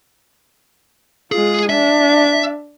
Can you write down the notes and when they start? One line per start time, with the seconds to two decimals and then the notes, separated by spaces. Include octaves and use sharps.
1.32 G#3 F4 G#4
1.69 D4 E5